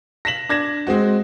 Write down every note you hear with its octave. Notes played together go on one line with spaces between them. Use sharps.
A#6 B6 E7 F#7
D4 G#6 A#6 E7
G#3 C4 F#4